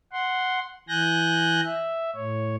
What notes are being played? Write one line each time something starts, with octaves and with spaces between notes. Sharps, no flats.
F#5 C6
E3 G#5 F#6 G6 A#6
E5
A2 C#5